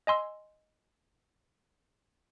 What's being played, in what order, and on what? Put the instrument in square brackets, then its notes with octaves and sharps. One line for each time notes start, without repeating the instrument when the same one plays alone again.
[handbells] D#5 G#5 C6 E6